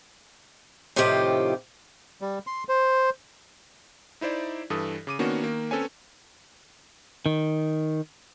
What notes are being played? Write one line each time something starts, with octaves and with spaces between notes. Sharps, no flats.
A2 C3 D#3 F3 F4 G4
G3
C6
C5
D#4 E4 C5 D5 E5
G2 E3 A4 D#6
C#3 D6 D#7
D#3 A#3 B3 C#4 D4 F#4
D#3 A#3
C4 C#4 A4 B4 C#5 G#5
D#3